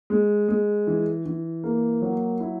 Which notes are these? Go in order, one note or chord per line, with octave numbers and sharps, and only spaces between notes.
G#3
G#3
E3
E3
A#3
F#3
E4